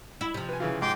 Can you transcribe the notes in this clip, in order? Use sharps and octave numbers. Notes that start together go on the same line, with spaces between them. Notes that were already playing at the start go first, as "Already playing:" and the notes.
E4
C3 F3
B4 G#5
C#3 E3 F4
G#2 G5 C6 D6